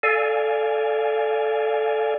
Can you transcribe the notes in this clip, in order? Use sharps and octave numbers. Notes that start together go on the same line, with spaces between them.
A4 D5 F5 G#5